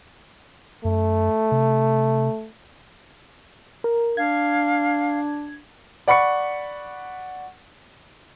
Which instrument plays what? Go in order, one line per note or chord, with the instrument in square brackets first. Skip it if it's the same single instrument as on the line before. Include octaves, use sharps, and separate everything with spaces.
[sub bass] F#2 [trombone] A3
[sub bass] C3
[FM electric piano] A#4
[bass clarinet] D4 [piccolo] F5 [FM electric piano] G#6
[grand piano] D5 F#5 B5 C#6 C#7